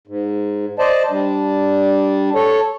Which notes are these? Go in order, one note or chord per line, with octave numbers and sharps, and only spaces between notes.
G#2
C5 D5 D#5 A5
G3 D4
A4 C#5